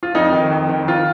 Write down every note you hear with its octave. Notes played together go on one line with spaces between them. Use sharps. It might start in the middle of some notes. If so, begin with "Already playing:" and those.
F4
F2 D#4
D#3
F2
D#3
D#3 F4